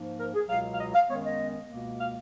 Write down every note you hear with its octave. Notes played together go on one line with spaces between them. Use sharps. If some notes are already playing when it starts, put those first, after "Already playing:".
Already playing: G#2 F3 A#3
A#4
G#4
C#2 B2 F#3 F5
F5
D#5
F5
F#2 D#3 G#3 B3 C#5
D#5
C#2 B2 A#3
F5